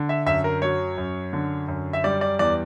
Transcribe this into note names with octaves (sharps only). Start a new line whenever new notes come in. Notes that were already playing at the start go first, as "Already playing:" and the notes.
Already playing: D3
E5
F#2 E5
A#4
F#3 C#5
F#2
D3
F#2
E5
G3 D5
D5
E2 D5